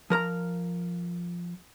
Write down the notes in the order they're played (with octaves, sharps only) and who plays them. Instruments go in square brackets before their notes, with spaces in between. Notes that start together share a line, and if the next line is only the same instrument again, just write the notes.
[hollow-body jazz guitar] F3 A#4 A#5